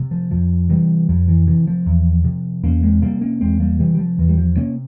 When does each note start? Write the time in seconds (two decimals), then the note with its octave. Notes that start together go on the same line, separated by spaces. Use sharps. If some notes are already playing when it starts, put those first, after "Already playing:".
Already playing: C3
0.11 F3
0.31 F2 F3
0.69 C3 E3 G3
1.09 F2 F3
1.28 E3
1.47 C3 E3
1.67 F3
1.86 E2
2.25 C3
2.63 E2 A#3 C#4
2.83 G#3 C4
3.02 C3 G3 A#3
3.21 A#3 C#4
3.41 E2 G#3 C4
3.60 G3 A#3
3.79 C3 E3 G3
3.94 G3
3.99 F3
4.19 E2 E3
4.29 G3
4.37 F3
4.57 C3 A#3 C#4